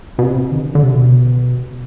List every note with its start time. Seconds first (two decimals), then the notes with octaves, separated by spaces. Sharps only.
0.19 B2
0.23 C3
0.52 D#3
0.57 D3
0.66 D#3
0.75 D3
0.83 C3
0.92 B2